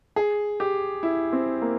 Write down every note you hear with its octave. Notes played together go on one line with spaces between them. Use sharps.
G#4
G4
E4
C4
A#3